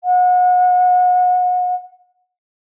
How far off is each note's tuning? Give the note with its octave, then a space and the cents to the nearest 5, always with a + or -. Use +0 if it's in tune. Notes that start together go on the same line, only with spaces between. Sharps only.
F#5 -35